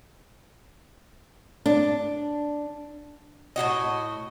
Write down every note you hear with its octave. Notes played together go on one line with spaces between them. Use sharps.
D4
A2 C#3 F#4 D#5